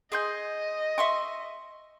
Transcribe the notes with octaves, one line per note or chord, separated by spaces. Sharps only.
G#4 D#5 C6 G6
E5 C6 C#6